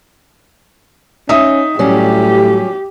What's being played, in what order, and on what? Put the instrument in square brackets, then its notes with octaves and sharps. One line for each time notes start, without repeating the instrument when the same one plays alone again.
[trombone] C#4 [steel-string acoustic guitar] D#4 [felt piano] E5 D#6
[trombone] A2 [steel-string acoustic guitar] F#3 G3 C#4 [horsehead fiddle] G4